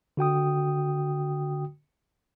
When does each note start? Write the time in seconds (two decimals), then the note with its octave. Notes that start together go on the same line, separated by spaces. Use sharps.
0.17 D3 F#4 G5 D#6